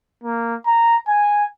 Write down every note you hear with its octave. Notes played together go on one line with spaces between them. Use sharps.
A#3
A#5
G#5